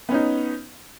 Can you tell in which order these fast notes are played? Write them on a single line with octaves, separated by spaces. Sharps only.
B3 C#4 D#4